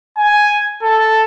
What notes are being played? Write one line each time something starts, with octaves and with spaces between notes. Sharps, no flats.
G#5
A4